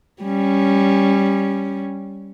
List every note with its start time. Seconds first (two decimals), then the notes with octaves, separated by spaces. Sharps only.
0.23 G3 C#4